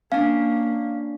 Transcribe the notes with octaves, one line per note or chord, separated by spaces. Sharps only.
A#3 C#4 D4 F5